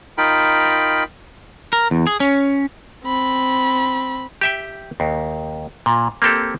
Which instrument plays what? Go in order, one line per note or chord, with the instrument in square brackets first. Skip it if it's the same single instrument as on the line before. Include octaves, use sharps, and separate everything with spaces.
[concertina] D#4 F4 A#4 G5 B5
[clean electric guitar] A#4
E2
G#4
C#4
[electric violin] C4 B5
[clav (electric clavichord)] G4 E5 G5
D#2
A#2
A#3 C4 G4 A4